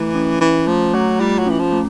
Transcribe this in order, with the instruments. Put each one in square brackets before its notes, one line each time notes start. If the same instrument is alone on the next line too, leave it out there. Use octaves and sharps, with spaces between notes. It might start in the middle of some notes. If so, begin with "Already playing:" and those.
Already playing: [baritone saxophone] E3 [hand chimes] A3
[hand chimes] C#4
[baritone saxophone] E3 [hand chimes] C#4
[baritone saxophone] F3 [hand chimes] A3
[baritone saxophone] F#3 [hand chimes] A3
[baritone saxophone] G3 [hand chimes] F4
[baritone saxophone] F#3
[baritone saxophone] E3 [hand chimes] C#4
[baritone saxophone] F3
[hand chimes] A3